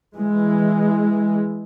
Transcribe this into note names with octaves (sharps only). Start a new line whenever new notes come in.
E3 G#3